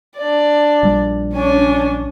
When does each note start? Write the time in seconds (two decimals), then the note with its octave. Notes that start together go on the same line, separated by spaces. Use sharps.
0.16 D4 D5
0.83 A#1 G3
1.34 C#4 D4 C#5 G#5